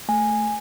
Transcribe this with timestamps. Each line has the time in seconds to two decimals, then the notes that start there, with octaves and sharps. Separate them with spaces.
0.09 A3 G#5